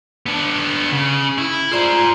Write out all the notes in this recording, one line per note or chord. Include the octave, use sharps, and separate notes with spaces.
B3 D4
C#3
E4
F4 G#4 C5 D5 A#5